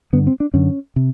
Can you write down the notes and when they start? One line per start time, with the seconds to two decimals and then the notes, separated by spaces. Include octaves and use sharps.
0.13 G2 D3 B3
0.27 C4
0.40 D4
0.54 F#2 D3 C#4
0.96 C3